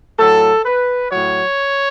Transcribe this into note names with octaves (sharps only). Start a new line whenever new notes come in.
A2 F#3 A4
B4
A2 F#3 C#5